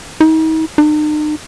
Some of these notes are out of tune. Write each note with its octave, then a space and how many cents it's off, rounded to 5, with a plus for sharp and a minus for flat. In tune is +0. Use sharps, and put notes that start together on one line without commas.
D#4 +40
D#4 -45